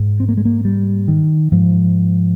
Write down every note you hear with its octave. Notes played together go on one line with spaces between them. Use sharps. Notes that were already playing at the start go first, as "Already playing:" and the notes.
Already playing: G#2
C4
A#3
G#3
A#3
G3
D#3
G#2 F3